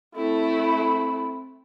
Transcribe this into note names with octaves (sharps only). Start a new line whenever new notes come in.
A3 C4 E4 A4 B5